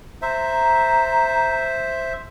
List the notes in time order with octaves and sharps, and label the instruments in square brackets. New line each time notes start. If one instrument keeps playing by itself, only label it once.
[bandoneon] C5 E5 [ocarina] A#5